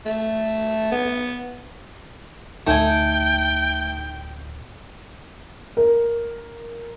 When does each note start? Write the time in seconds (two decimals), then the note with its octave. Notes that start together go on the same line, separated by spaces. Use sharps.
0.06 A3
0.92 B3
2.67 D2 A2 A3 D#4 G5 G#5
5.77 A#4